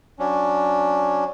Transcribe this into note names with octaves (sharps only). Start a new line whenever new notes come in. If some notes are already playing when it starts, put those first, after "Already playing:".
F#3 C#4 D4